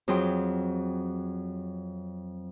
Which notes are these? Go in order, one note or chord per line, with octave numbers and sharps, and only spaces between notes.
F2 F#3 G#4 G5 C6